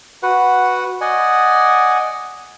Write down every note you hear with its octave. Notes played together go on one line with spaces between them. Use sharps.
F#4 B4 F#5
D5 D#5 F#5 G#5